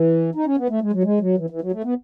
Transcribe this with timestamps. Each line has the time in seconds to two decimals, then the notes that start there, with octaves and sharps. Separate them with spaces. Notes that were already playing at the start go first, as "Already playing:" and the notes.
Already playing: E3
0.35 D#4
0.46 C#4
0.57 B3
0.69 A3
0.81 G#3
0.93 F#3
1.04 G#3
1.20 F#3
1.38 E3
1.50 E3
1.61 F#3
1.72 A3
1.84 B3